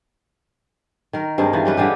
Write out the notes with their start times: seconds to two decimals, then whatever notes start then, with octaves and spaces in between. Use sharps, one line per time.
1.13 D#3 A#4
1.38 G2 G#3 C4 A#4
1.53 D#3 E3 F4
1.65 G3 C#4 B4
1.77 D3 G3 G#3 G4